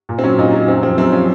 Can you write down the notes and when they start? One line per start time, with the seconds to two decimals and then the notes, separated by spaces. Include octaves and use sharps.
0.09 A#2
0.18 C4
0.23 F#3 C#4
0.38 A#2 D#4
0.53 F#3
0.68 F#2 C4
0.83 F3 C4
0.98 F#2 C4
1.12 F3 C#4